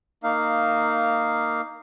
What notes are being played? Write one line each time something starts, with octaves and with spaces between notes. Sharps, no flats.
A#3 D#4 F5